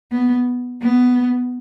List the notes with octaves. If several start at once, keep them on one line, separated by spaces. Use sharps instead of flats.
B3
B3